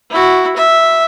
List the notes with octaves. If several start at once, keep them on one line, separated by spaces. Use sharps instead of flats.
E4 F#4
E5